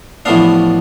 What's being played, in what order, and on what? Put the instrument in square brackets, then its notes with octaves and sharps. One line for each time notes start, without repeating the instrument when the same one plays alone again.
[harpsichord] A1 A2 F3 B3 D4 F5